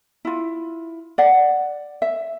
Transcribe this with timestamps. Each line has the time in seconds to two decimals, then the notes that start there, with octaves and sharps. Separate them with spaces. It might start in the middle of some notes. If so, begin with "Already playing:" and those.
0.25 E4 F4
1.18 D5 F#5
2.02 E5